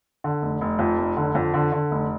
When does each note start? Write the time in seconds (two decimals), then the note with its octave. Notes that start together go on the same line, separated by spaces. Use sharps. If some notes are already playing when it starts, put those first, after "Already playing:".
0.24 D3
0.42 F1
0.61 F1
0.79 F2
0.98 F1
1.17 D3
1.35 F2
1.54 D3
1.72 D3
1.91 F1